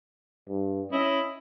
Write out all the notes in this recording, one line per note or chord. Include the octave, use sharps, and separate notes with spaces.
G2
C#4 E4 D#5